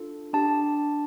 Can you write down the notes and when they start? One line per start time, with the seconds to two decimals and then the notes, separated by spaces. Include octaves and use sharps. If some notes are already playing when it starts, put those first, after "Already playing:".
Already playing: D4 F4 A4
0.33 D4 G4 A5